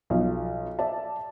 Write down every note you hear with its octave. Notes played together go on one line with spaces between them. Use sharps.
B1 F3
D5 E5 A5